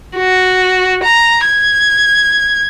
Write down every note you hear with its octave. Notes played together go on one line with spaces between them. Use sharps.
F#4
A#5
G#6